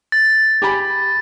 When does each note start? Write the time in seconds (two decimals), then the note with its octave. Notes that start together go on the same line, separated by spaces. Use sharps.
0.12 A6
0.62 G4 G#5 B5